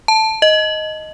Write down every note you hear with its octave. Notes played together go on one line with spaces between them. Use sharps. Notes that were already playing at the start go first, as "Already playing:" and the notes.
A5
D#5